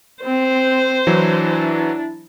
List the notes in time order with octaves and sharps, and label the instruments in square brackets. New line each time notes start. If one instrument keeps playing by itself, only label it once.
[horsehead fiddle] C4 [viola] C5
[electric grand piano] E3 F#3 [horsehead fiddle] D4 E4